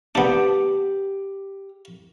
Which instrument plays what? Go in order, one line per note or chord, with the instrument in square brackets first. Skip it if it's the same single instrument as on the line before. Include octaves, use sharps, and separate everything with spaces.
[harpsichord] B3 D4 [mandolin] G4